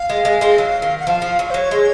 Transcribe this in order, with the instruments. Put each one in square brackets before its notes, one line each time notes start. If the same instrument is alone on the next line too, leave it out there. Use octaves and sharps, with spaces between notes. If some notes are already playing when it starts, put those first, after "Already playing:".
Already playing: [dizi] F5
[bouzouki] G#3
G#3
G#3 C4
F#3
D#3
[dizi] F#5
[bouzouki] F3 [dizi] F5
[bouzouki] F3
F#3
[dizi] C5
[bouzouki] F#3 [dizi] C#5
[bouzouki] G#3